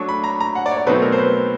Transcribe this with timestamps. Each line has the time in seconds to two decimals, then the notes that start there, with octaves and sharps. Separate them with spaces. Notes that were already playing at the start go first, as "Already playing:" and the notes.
Already playing: F#3 A3 D4 C#6
0.09 B5
0.24 A#5
0.40 A#5
0.55 F#5
0.66 D5
0.71 C#5
0.77 D5
0.87 B2 F#3 A3 C4 D#4 B4
1.02 A#4
1.12 C5
1.18 B4